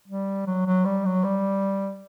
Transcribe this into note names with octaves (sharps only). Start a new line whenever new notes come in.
G3
F#3
F#3
G3
F#3
G3